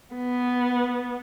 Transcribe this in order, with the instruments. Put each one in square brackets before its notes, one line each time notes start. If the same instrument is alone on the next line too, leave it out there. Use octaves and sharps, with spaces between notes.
[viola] B3